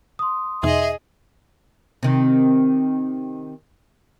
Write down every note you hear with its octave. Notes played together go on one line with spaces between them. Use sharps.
C6 D#6
E2 B2 D#4 G#4 D#5 E5
C3 D#3